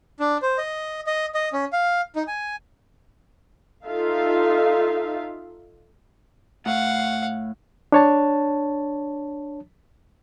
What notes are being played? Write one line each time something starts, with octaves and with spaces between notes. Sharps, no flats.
D4
C5
D#5
D#5
D#5
C#4
F5
D#4
G#5
D#4 F4 A4 E5 F5
A2 F5 F#5
D4 C#5 A5